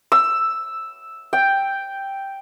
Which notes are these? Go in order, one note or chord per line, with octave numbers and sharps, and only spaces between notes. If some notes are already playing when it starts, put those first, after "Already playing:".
E6
G5